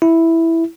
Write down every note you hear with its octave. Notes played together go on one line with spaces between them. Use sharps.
E4